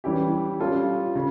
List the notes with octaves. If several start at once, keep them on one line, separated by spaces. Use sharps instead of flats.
E3 G3 C#4 E4 G4
G3 C#4 F4 A4
C#3